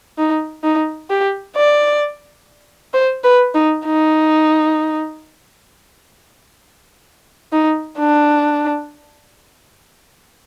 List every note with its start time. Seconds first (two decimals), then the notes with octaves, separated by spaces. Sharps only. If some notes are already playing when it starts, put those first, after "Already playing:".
0.18 D#4
0.64 D#4
1.10 G4
1.56 D5
2.94 C5
3.24 B4
3.54 D#4
3.86 D#4
7.52 D#4
7.98 D4